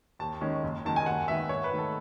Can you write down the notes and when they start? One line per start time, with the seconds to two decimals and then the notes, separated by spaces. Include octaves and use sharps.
0.19 D#2 A5
0.41 D#3 G#3 C#4
0.63 F#1
0.85 F#2 D#3 G#3 D#4 A5
0.96 G#5
1.06 D#2 F#5
1.28 D#3 G#3 B3 E5
1.49 G#2 C#5
1.64 B4
1.71 D#3 A3
1.78 A4